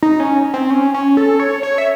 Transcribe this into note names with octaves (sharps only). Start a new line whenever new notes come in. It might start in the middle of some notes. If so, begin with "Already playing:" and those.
D#4
C#4
C4
C#4
C#4
A4
C#5
C#5
E5